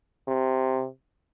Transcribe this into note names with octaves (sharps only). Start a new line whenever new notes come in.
C3